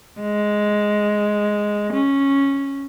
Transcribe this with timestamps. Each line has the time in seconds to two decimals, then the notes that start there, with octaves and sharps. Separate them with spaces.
0.21 G#3
1.93 C#4